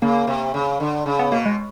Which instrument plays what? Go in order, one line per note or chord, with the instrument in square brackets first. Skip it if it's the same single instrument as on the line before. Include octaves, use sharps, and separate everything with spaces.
[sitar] C#3 [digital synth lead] A#3
[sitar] C3
C#3
D3
C#3
[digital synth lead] B3
[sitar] B2 [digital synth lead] A#3
[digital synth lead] G#3